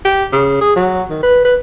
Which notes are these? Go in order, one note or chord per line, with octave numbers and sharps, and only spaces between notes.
G4
C#3
G#4
F#3
D#3
B4
B4